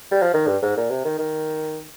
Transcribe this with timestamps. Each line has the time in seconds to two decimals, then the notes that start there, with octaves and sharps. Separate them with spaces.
0.12 G3
0.22 F3
0.34 D#3
0.47 G2
0.62 G#2
0.77 A#2
0.90 C3
1.05 D#3
1.19 D#3